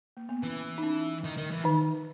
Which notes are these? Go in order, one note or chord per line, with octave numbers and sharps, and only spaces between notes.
A#3
B3
E3 C#4
D#4
C#4
D#3
D#3
E3
D#3 D#4